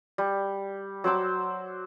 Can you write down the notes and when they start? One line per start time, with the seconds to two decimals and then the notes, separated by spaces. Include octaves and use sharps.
0.18 G3
1.04 F#3 C5 D6 E6